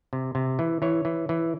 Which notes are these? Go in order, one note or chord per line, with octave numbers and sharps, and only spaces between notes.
C3
C3
E3
E3 C#5
E3
E3